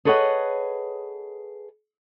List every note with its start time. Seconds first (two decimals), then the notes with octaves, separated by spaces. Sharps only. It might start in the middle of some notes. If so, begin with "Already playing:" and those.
0.05 G#4 A4 B4 C#5 D#5 F#5